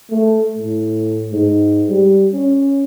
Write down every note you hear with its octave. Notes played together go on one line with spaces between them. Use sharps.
A3
A2
G#2
G3
C#4